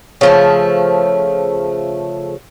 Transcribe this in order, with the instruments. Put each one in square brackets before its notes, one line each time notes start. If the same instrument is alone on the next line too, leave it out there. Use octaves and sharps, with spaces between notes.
[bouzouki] C#3 F3 A3